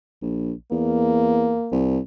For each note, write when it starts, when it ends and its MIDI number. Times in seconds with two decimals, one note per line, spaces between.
0.22 0.52 34
0.72 1.55 40
0.72 1.78 58
1.72 1.99 36